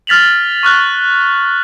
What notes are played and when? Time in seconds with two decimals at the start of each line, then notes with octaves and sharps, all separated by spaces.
0.07 F6 A6 B6 F7 F#7
0.63 C#6 F6 F#6 A6